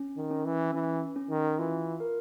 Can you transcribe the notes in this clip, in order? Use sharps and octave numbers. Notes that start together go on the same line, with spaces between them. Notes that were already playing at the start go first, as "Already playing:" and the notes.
Already playing: C#4
D#3
C#4
E3
E3 C#4
C#4
D#3
E3 F4
A#4